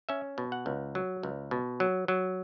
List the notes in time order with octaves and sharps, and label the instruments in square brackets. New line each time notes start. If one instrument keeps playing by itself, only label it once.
[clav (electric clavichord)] C#4 E5
B2
F#5
C#2
F#3
C#2
B2
F#3
F#3